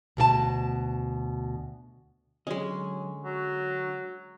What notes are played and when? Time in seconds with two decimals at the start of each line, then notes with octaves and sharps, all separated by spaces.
0.17 D2 B2 F#4 A5
2.47 D3 F#3 G#3 C#4 D#5
3.24 F#3 F#4